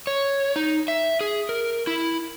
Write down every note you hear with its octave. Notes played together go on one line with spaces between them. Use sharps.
C#5
D#4
E5
G#4
A#4
E4